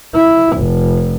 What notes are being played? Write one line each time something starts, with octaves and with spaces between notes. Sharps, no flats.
E4
F1